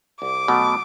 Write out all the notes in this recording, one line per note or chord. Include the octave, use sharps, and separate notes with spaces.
C2 D6
B2 F#3 A3